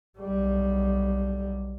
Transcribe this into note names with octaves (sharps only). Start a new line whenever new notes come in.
B1 G3